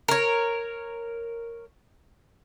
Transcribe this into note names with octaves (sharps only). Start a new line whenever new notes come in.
A#4 C#5